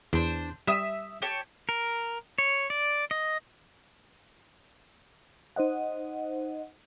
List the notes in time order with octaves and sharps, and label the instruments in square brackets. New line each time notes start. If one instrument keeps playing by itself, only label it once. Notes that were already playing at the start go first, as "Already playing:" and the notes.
[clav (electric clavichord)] E2 [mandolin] D4 C5
[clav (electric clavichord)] G3 [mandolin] E5 D#6 E6
[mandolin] G4 C#5 A5
[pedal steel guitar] A#4
C#5
D5
D#5
[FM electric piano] D#4 C5 D#5 F#5